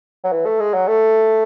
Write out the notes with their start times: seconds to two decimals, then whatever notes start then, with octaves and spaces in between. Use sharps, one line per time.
0.24 F#3
0.32 E3
0.46 A3
0.60 G#3
0.74 F#3
0.87 A3